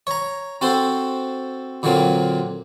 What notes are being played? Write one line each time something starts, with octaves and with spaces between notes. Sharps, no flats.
C#5 A#5
C4 F#4 A4 C5
A#2 D3 F#3 A#3 C4